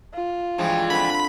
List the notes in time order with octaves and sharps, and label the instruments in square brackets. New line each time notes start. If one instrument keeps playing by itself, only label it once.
[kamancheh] F4
[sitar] G2 E3 F3 [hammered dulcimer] G#3
[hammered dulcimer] D3 C4 [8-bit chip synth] B5